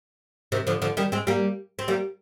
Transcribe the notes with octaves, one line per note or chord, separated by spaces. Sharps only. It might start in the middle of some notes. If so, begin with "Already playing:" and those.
C3 D#3
D3 F3
D3 F3
D#3 G3
G#3 C4
G3 A#3
C4
G3 A#3